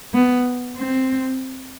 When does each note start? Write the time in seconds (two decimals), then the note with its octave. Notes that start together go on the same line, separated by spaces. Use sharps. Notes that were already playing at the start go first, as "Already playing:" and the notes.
0.14 B3
0.78 C4